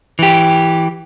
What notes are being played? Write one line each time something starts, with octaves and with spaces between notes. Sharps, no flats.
E3 G4